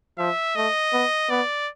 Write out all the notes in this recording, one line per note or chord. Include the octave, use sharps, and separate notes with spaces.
F3 E5
A3 D#5
B3
B3 D5